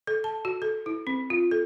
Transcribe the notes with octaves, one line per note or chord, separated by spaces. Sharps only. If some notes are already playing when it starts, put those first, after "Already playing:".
A4
A5
F#4
A4
E4
C4
F4
A4